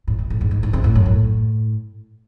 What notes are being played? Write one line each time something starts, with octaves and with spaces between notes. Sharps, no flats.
A2
C3
A2
G#2
G#2
G#2
C3
A2
F#2
A2